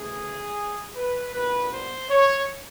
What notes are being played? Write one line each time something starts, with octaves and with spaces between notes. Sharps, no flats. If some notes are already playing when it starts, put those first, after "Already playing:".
Already playing: D2 C#3 E3 A3 G#4
B4
C2 A#2 G3 B3 D4 B4
C5
C#5